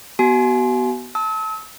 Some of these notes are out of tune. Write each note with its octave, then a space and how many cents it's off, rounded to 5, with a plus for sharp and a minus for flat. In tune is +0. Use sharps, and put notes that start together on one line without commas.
B3 -5 F#4 +35 G#5 +35
A5 +0 E6 -40